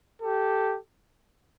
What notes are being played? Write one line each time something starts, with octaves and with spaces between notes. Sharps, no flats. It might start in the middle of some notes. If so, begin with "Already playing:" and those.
G4 A4